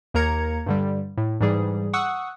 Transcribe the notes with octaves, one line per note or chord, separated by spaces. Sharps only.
D#2 A#3 A#4 A#5 G#6 C#7
G2 D3 G3
A2
G#2 E3 G3 G#4
F#5 C#6 D#6 E6 F#6